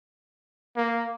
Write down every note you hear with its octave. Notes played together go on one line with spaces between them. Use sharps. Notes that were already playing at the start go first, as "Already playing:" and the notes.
A#3